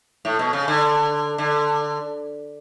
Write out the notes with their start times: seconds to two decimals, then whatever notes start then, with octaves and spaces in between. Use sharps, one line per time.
0.25 A2
0.39 B2
0.53 C#3
0.68 D3
1.38 D3